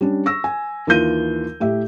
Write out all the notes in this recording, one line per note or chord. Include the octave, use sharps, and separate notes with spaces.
G3 C#4 D4
C#6 E6 A#6
G#5
D#2 E3 F4 G6 D#7
A2 G4 E5